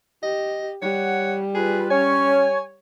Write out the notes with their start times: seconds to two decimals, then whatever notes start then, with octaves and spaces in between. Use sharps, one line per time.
0.23 G4 D#5
0.82 G3 C#5 F#5
1.55 F4 G#4 B4
1.91 C#4 C#5 G#5